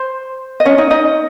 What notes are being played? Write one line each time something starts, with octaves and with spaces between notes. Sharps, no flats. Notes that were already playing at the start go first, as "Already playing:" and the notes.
Already playing: C5
D#5
C#4 C#5
D#4 D#5
D#4 D#5